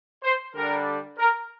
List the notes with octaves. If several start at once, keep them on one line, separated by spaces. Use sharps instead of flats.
C5
D3 G3 D4 A#4
A#4